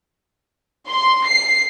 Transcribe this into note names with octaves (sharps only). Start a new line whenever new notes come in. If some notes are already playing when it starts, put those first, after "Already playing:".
C6
C7